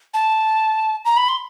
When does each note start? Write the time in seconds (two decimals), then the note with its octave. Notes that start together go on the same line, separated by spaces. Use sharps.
0.14 A5
1.05 A#5
1.17 B5
1.28 C6